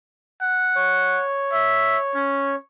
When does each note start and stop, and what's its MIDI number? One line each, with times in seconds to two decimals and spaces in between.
0.42 1.23 78
0.76 2.56 73
1.53 1.98 76
2.15 2.57 61